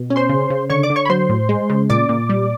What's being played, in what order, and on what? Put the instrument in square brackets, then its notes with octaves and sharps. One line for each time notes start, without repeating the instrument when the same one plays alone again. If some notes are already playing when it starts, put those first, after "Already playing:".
Already playing: [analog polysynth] B2
C#4
C5 C6
C#3
C#3
D3 C#5 C#6
D5 D6
D3
C#5 C#6
B5
F#3 C5 C6
A2
G#3
C#3
A#2 D5 D6
A#2
G3